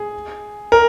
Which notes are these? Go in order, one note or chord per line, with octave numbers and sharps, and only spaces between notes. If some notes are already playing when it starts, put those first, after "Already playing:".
Already playing: G#4
A#4